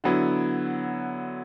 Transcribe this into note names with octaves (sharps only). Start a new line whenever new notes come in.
D3 F#3 B3 E4